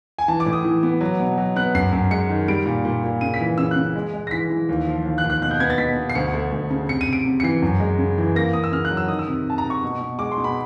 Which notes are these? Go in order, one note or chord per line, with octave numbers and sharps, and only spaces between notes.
G#5
E3 A5
D6
A2
D#6
E3
B3
F#3
B2
F#3
B3 F#6
F#2 C7
F#2
G#3 C#7
D#3
G3 D7
A#2
A#2
A#2
C#3 D#7
B6
E3
C#3 E6
F#6
C#3
G#3
G#3
A#6
E3 B6
E3
D#2
F3
D#2
F#6
D#2
F#6
B2 F#6
G6
B3 G#6
A6
B2 B6
B2
C7
D2 C#7
A3
D2
C#3
C3 C#7
D#7
C3 D7
C3
C#7
E3 C7
F#2
G#3
C#3
E3
A#3 A#6
A#3 D#6
E6
C#3 F6
F#6
F#3
E6
D#3 D#6
E6
C3
C3 A5
A#5
C3
C#6
B2
B2
G#3 D6
C6
B2
B5